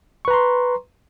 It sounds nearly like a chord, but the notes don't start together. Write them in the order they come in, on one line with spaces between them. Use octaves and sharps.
C#6 B4 A#5 C6